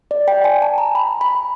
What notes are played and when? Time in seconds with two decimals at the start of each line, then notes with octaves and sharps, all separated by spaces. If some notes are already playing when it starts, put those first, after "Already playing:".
0.11 D5
0.28 G5
0.44 G#5
0.62 A5
0.78 A#5
0.95 B5
1.21 B5